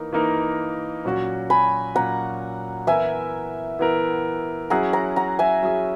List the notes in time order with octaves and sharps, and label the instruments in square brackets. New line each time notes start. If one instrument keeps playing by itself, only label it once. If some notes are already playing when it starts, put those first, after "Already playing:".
Already playing: [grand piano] E3 A#3 D#4 A#4
E3 A#3 D#4 A#4
A#2 F#3 C#4 F#4
[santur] G#5 B5
[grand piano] A#2 F#3 C#4 F#4 [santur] F#5 A#5
[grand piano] E3 B3 E4 A#4 [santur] E5 G#5
[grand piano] E3 B3 E4 A#4
[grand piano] F#3 C#4 E4 G#4 [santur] F#5 A#5
[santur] F#5 A#5
F#5 A#5
E5 G#5
[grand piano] F#3 C#4 E4 G#4